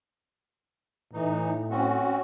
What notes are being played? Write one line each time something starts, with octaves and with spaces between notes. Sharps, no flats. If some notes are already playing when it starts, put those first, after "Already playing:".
A2 E3 D#4
C4 C#4 F#4